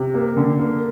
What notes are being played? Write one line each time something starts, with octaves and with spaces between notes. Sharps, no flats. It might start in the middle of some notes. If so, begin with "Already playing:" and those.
Already playing: C3
A#3
D3
A#3